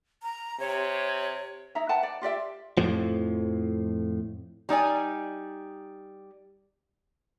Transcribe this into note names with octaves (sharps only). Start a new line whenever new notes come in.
A#5
C3 C#5
D#4 E4 E5 A#5
B4 F#5 G5 A5
D5
F4 G4 D5 E5
F2 A2 F3
G3 D#4 D5 G#5